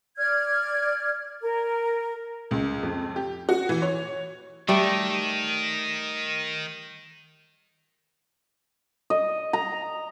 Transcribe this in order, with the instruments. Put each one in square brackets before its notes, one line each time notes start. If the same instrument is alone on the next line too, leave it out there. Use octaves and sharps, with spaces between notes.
[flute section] D5 F6 G#6
A#4
[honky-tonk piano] C#2
F2
G4
F#4
E3
C#5
[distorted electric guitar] D#3 [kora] G3 A3
[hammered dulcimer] D#5
A#5